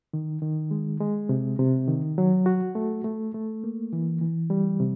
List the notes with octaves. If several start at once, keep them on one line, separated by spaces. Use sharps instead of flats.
D#3
D#3
G#3
G#3
C3
C3
D#3
F#3
F#4
A3
A3
A3
A#3
E3
E3
G3
C3